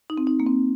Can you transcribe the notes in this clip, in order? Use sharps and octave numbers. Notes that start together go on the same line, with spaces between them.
D#4
C4
D#4
A#3
C4